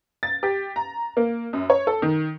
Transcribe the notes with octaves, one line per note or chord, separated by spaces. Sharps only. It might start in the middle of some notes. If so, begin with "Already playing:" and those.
A6
G4
A#5
A#3
F#2
C#5
A4
D#3